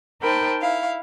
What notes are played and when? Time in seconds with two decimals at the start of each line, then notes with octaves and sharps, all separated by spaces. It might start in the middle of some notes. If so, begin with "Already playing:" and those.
0.22 D#4 A#4 C5 G5 A5 B5
0.60 E4 F5